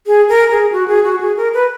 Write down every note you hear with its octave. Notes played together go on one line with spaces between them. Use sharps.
G#4
A#4
G#4
F#4
G#4
F#4
G#4
A#4
B4